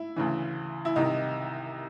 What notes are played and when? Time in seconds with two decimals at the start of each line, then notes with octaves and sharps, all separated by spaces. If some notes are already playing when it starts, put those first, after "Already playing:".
Already playing: E4
0.16 D2 C#3 E3
0.85 E4
0.96 C2 C3 D#3 D#4